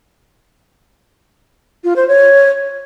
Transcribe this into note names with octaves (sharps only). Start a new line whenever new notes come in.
F4
C5
C#5